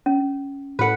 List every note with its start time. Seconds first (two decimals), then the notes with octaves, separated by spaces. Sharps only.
0.06 C#4
0.79 A2 F#4 A4 B4 F#5